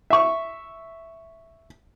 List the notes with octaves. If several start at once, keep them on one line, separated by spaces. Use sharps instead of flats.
E5 C#6